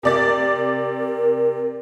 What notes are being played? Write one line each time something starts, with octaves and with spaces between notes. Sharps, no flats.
C3 A#4 D5 A6